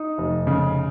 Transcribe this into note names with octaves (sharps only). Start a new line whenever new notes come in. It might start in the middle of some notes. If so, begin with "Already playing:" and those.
Already playing: D#4
F1
C#3